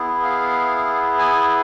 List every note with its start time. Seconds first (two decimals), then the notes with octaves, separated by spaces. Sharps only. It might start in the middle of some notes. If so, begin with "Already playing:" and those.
Already playing: B3 E4 G#4
0.23 F5
1.19 G#5